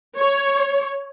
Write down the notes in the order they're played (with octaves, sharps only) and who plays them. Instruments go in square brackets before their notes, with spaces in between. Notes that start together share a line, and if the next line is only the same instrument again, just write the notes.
[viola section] C#5